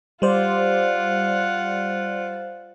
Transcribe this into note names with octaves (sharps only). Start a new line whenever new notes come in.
G3 F4 C5 D5 F#5